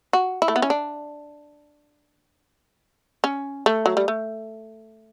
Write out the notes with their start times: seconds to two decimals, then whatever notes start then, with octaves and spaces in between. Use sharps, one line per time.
0.13 F#4
0.42 E4
0.48 A3
0.56 B3
0.62 C#4
0.70 D4
3.24 C#4
3.66 A3
3.86 F#3
3.97 G3
4.08 A3